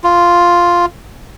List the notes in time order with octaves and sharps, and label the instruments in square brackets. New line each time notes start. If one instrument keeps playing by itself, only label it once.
[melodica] F4